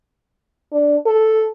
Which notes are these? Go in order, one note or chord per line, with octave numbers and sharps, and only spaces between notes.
D4
A4